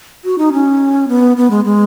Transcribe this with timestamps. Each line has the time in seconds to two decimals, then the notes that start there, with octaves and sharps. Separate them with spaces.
0.25 F#4
0.38 D#4
0.53 C#4
1.08 B3
1.37 B3
1.50 G#3
1.65 G#3